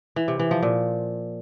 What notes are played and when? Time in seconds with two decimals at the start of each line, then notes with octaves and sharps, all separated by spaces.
0.16 E3
0.28 C3
0.39 E3
0.51 F3
0.62 A#2